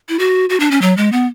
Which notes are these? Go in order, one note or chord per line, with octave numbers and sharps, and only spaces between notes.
E4
F#4
F#4
D4
C#4
F#3
G#3
B3